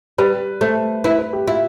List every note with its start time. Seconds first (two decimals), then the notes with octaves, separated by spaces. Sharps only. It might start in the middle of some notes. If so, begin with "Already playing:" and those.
0.18 G3 B4
0.61 A3 C5
1.04 E4 B4
1.19 B4
1.33 G4
1.47 E4 F4